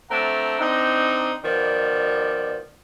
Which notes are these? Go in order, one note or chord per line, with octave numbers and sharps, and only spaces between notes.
A3 C4 D4 F#5 A#5
C4 D4 D#4
B2 D#3 F3 D5